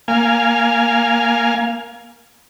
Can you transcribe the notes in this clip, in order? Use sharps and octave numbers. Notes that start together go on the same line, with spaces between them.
A#3 F5 G#5